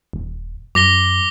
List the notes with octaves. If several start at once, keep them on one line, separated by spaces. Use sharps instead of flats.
D#1
F#2 D6 A#6 G7